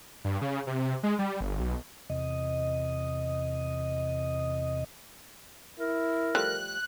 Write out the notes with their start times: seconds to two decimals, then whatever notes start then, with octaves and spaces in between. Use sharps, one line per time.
0.25 G2
0.42 C#3
0.67 C3
1.03 G#3
1.19 G3
1.41 G1
1.60 B1
2.10 E2 C3 D#5
5.79 E4 A#4
6.35 F3 G3 A3 F#6